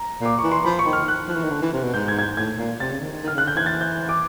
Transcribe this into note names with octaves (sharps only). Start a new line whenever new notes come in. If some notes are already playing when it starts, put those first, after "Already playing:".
Already playing: A#5
A#2 D6
E3 C#6
C6
F3 B5
C#6
D#3
F6
F#6
F3
E3
D#3
D3
E3
C3
B2
G#2 G6
G#6
G#6
G6
A2 G#6
A#2
C3 A6
C#3
D#3
D#3
D#3
F6
C#3
F#6
D3 G6
E3 G#6
A6
G6
D6